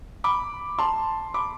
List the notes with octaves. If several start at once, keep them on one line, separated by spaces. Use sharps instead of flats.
B5 D6
A5 C6
B5 D6